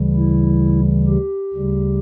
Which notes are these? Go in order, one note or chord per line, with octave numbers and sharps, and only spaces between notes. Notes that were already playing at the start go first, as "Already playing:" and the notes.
Already playing: D2 C#3 E3 G3
E4
G4
D2 C#3 G3